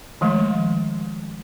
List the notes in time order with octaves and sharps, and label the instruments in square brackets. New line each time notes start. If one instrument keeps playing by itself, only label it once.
[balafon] D#3 F3 G#3 A3